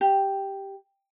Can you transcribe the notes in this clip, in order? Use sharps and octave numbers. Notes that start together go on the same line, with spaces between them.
G4